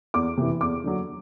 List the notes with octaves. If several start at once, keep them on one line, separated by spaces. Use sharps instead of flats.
E2 D6
C3 E3
E2 D6
D3 F#3